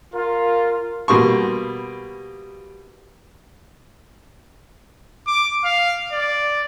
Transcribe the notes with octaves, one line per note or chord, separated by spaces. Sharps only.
F4 A#4
B2 G3 A#3 C6 C#6
D6
F5
D5